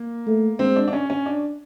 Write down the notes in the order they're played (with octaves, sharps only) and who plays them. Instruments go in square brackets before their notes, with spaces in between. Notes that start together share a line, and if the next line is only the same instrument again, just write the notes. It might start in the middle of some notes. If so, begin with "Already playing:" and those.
Already playing: [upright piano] A#3
[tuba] A3
[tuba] G#3 [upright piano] C4
[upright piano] D4
D4
C#4
C#4
D4